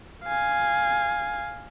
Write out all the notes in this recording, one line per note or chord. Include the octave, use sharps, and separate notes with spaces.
F5 G#5